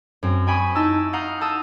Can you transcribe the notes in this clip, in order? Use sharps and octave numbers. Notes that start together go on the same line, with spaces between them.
F#2 C4
G5 G#5 B5 C#6 D#6
D#4 E4 A5 E6
F5 F#5 A#5 D#6 G6
A5 D#6 E6 G6